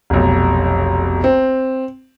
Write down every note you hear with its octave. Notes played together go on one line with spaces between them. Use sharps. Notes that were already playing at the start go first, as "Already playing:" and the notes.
F1 B1
C4